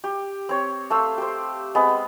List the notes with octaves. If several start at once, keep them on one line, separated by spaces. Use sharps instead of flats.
G4
C4 C#5
A3 F5 C6 E6
G4 C5
G#3 B3 C4